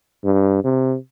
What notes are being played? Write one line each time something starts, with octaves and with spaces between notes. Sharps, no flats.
G2
C3